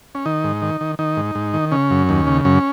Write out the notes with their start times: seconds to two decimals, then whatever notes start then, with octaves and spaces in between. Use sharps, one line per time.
0.15 C#4
0.26 D#3 D#4
0.44 G#2
0.62 D#3
0.81 D#3
0.99 D#3 D#4
1.17 G#2
1.35 G#2
1.54 D#3
1.72 C#3 C#4
1.90 F#2
2.09 D#2
2.27 C#3
2.45 F#2 C#4